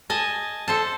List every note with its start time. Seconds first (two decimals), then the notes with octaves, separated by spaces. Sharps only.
0.10 D#5 G#5 A5
0.68 A4 C5 A5